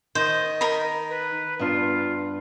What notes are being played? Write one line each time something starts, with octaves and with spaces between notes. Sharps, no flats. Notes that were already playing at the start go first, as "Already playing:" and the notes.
D#3 C5 D#5
A#4 B5
B4
G2 B3 D4 F4